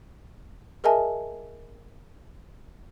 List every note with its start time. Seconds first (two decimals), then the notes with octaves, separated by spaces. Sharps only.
0.84 G#4 A#4 D#5 E5 G#5 A5